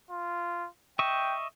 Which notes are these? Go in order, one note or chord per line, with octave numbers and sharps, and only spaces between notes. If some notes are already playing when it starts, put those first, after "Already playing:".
F4
D#5 E5 G5 C#6